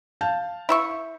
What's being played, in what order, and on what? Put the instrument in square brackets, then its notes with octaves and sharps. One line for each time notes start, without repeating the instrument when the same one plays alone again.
[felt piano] F5 A5 G6
[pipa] E4 E5 C#6